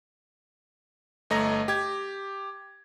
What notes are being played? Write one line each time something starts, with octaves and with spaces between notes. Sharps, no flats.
G1 A3 D#5 A#5 A#6
G4 G#6